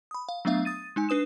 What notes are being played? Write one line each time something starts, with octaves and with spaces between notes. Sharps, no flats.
B5 D#6
F5
F#3 A3 B3 D4 E5 F5
D#6 A6 D#7
G#3 D#4 G#5
D4 B4 D#6 E7